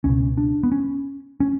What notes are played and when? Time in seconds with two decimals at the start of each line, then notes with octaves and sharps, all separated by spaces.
0.04 C#2 B2 C#4
0.37 D4
0.63 B3
0.72 C#4
1.40 C#4